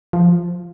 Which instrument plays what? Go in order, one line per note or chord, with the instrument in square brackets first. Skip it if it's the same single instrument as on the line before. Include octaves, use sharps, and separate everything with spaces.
[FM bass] F3